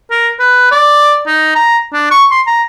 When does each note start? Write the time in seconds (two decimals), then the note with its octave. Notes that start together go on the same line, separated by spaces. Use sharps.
0.11 A#4
0.39 B4
0.71 D5
1.27 D#4
1.55 A#5
1.93 D4
2.11 C#6
2.31 C6
2.47 A#5